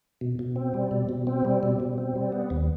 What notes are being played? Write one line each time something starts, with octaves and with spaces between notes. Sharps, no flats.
B2
B2
C4
G3
B2
B2
C4
G3
B2
B2
C4
G3
B3
D#2